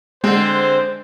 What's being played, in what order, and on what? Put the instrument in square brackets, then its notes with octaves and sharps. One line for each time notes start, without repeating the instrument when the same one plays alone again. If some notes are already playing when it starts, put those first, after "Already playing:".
[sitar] D3 C4 [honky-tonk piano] G#3 [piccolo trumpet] C5